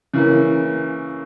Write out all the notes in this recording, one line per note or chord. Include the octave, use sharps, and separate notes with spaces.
C#3 E3 A#3